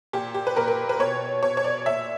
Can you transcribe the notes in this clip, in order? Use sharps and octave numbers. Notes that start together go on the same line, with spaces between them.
A#2 G4
G4
B4
A#2 A#4
A#4
B4
B2 C#5
B2 C#5
C#5
D5
A#2 E5